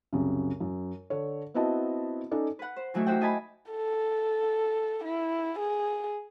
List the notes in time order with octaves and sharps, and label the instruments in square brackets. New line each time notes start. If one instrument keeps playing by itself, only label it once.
[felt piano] C2 F#2 C#3
F#2
D3 A4 C#5
B3 C4 E4 F#4 D#5 A5
C#4 D#4 A4 D5
[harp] B4 F#5
C5
E3 F#3 A3 D#4 E4
D#4 F#4 G4 C5 F#5 G5
E4 D#5 G#5 A5 B5
[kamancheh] A4
E4
G#4